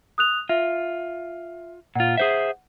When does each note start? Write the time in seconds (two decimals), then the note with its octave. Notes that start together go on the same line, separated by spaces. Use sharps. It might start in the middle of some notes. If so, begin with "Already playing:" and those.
0.18 D#6 F#6 F7
0.49 F4 E5
1.96 A#2 F4 F#5
2.17 G#4 C5 E5